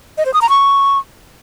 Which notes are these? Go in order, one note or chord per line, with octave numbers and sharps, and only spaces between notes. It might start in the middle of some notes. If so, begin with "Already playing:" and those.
D#5
C5
D#6
A#5
C#6